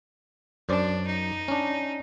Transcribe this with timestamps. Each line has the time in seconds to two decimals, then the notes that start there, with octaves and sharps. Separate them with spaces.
0.69 F#2 D4 C5 D5
1.07 D#4
1.48 C#4 D4